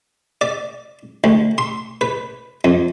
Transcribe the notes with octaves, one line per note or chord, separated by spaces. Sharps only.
D5
D2
C6
B4
F2